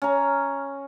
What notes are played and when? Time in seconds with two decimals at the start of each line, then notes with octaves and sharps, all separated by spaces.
0.02 C#4 A#5